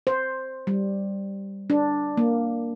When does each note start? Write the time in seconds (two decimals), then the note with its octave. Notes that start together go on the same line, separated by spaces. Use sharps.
0.07 C5
0.67 G3
1.70 D4
2.17 A#3